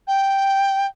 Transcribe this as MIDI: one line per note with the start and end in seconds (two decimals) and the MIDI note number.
0.07 0.86 79